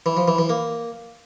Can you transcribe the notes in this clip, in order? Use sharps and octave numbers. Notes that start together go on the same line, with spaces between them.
E3
F3
E3
E3
A#3